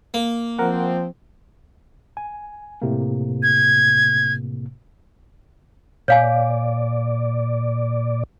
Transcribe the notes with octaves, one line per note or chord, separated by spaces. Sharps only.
A#3
F3 C4 A#4 F#5
G#5
A2 C3 A#3
G#6
A#2 C#5 D5 F5 G#5